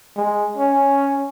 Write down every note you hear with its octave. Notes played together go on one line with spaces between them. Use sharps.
G#3
C#4